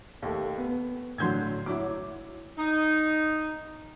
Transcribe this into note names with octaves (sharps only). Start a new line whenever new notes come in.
D#2 A3
B3
A2 D3 F#3 C6 G6 G#6
F#3 E4 C#5 D6
D#4